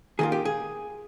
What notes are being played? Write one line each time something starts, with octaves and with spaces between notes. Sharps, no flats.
D#3 A#3 F4 G#4
G4
G#4